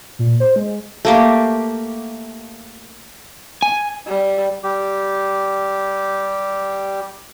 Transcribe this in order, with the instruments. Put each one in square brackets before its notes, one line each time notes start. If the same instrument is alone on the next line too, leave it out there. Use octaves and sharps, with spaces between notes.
[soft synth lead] A#2
C5
G#3
[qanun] A3 A#3 G4
[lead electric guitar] G#5
[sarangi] G3
[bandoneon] G3 G4